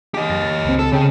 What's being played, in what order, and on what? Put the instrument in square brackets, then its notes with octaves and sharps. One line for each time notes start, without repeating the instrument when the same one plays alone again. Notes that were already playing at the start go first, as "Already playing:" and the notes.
[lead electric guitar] G4 D#5
[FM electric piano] F#2 A6 A#6
C#2 C4
[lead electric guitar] A4
[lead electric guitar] C#3 [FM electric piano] C#4 G5